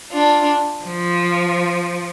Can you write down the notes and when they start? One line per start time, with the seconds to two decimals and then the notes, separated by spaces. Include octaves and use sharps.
0.12 D4 F4
0.85 F3